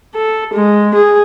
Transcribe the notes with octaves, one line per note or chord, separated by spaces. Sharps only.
A4
G#3
G#4